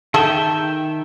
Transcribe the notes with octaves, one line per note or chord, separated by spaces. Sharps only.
D#3 G#4 A4 E5 G5